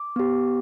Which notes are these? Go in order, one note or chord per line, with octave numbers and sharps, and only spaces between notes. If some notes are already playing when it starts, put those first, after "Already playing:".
Already playing: D6
B3 G4